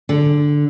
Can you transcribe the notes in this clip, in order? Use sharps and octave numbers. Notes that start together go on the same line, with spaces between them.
D3